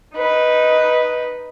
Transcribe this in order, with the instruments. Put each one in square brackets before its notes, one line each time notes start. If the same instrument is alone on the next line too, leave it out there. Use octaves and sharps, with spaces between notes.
[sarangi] D#4 [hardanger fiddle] B4